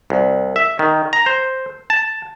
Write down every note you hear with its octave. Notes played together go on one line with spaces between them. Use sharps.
C2
E5
D#3
A#5
C5
A5